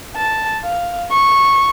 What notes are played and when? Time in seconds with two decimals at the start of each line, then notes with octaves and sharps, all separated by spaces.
0.16 A5
0.64 F5
1.11 C#6